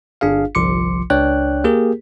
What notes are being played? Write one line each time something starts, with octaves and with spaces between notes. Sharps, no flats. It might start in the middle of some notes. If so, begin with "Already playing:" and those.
G1 D4 G#4 F5
G1 C2 F3 C6 D6 C#7
C#2 D4 C#5 D5 G5 F#6
A#3 G4 G#4 A#4